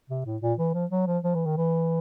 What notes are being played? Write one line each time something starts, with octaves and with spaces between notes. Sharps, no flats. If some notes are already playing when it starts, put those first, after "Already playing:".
C3
A2
A#2
E3
F3
F#3
F3
F3
E3
D#3
E3